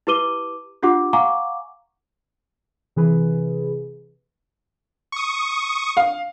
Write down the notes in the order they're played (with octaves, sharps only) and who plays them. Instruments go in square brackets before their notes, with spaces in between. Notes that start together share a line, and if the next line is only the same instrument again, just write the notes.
[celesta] E4 G4 B4 D6 D#7 G7
D4 F4 G4 F#5 D6
F5 F#5 G#5 A#5 C#6 D6
[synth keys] C3 E3 G#4 B4
[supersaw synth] C#6 D#6
[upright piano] F5